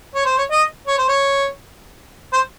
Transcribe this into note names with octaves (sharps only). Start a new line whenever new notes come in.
C#5
C5
C#5
D#5
C#5
C5
C#5
C5